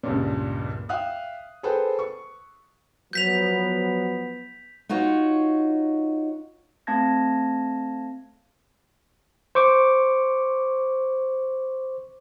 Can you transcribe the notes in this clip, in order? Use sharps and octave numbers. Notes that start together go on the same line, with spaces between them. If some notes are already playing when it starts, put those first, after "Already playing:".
C#2 G2 A#2
E5 F5 G5 D#6 F#6
G#4 A4 B4 C5 G5
C#6
F3 F#3 B3 G6 B6 F7
D#4 F4 F#4 C#5
A3 C4 F5 A5 G#6 A#6
C5 C#6 D6